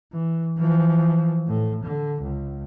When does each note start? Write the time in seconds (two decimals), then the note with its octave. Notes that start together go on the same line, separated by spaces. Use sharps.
0.12 E3
0.58 E3 F3
1.47 A2
1.85 D3
2.21 C#2